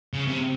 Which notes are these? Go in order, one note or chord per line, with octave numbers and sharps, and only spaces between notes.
C#3
C3